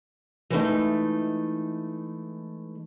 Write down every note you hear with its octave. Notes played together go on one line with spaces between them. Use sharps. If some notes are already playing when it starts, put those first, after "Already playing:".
E3 G#3 A3 D#4